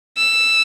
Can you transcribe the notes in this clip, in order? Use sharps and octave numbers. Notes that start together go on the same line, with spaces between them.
E6